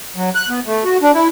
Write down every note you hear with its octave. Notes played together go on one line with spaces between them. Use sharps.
F#3
F#6
B3
A3
F#4
D4
E4